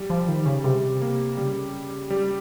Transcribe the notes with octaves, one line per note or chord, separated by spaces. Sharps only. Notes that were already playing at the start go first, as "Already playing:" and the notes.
Already playing: G3
F3
D#3
C#3
C3 G3
A#3
C#3 G3
G3